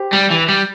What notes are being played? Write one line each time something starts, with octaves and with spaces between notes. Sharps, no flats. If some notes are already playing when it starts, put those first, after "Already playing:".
Already playing: G4 C5
G3
E3
G3